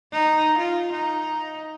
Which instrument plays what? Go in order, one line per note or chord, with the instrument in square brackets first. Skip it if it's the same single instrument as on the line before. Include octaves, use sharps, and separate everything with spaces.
[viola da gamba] D#4
F4
D#4